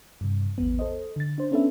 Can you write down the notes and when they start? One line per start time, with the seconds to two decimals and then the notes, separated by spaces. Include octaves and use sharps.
0.21 G2 C3
0.58 A1 E2 B3
0.79 A4 C5 D#5
1.16 D3 A6
1.38 D4 C5
1.51 B3 C#4 D4 A4 B4 E5